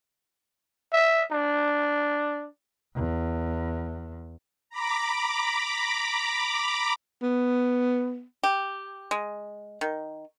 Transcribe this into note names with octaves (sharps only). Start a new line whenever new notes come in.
E5
D4
E2
A#5 B5 D6
B3
G4
G#3
D#3